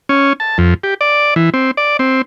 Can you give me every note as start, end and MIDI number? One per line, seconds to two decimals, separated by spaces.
0.09 0.33 61
0.40 0.58 81
0.58 0.74 41
0.83 0.94 67
1.01 1.34 74
1.36 1.50 52
1.54 1.71 60
1.77 1.97 74
1.99 2.22 60